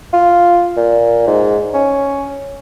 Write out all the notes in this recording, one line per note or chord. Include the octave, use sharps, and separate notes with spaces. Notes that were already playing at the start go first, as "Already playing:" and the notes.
F4
A#2
G#2
C#4